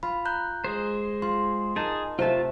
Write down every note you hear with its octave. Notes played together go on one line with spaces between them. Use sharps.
F4 B5
A#5 F#6 G6
G#3 G#4 C5
F4 C6
D#4 G#4 A#4 G#5 A5
C3 A3 F4 E5 A5